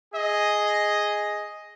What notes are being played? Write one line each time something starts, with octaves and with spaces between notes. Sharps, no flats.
G#4 D#5